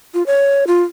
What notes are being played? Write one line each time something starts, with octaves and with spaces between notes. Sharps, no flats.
F4
C#5
F4